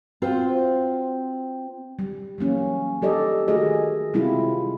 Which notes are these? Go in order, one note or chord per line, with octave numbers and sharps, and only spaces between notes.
C4 F4 F#4 C5
G3
E3 F#3 A#3 C#4
G3 G4 A4 D5 D#5
D#3 A3 F#4 G#4 A#4 D#5
C3 G3 G#3 C4 E4 F4